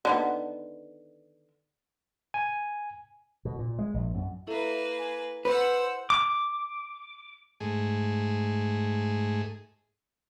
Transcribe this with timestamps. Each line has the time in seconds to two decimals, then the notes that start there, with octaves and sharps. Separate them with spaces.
0.05 D3 D#3 B3
2.34 G#5
3.45 B2
3.59 A#2
3.79 G#3
3.94 A#1
4.14 F#2
4.47 A#3 E4 A4 B4 E5
4.98 G#5
5.45 B4 C5 F#5 E6
6.10 D6
7.60 G#2 A3 G#4